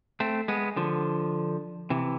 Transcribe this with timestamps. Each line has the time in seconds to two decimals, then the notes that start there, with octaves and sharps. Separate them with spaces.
0.20 A3 C4
0.48 G#3 B3
0.76 D3 F3
1.90 C3 E3